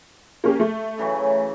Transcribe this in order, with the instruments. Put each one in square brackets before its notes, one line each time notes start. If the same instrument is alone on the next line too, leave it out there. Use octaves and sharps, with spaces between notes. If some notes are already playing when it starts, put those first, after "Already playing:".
[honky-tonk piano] A#3 C#4 G4
A3
[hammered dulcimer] C#3 E3 F#3